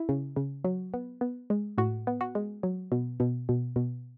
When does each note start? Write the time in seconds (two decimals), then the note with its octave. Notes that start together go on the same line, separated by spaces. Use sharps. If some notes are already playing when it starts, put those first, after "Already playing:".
Already playing: E4
0.09 C#3
0.36 C#3
0.64 F#3
0.94 B3
1.21 B3
1.50 G#3
1.78 A2 F#4
2.07 B3
2.21 F#4
2.35 G#3
2.63 F#3
2.92 B2
3.20 B2
3.49 B2
3.76 B2